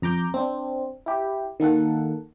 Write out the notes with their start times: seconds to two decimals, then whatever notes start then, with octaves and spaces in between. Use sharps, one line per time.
0.02 F2 A#5 D6 G6
0.34 C4 D4
1.06 E4 G4
1.60 D#3 A#3 A4 F#5